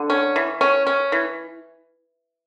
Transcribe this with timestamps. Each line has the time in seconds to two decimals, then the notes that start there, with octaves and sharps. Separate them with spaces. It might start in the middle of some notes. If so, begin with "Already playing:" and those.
Already playing: D3
0.10 C#4
0.36 E3
0.61 C#4
0.87 C#4
1.12 E3